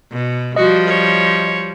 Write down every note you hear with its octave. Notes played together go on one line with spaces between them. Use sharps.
B2
F3 G3 F#4 D#5
C#5